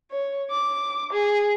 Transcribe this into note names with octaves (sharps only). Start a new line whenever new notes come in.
C#5
D6
G#4